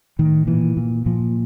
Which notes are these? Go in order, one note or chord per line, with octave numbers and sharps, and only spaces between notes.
A2 D#3
A#2 E3
A#2
A#2 F3